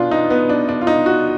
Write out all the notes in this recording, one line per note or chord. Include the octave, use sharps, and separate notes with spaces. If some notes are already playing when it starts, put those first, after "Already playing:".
Already playing: B2 D4 F4
D#4
B3
D4
D4
F4
D#4
F#4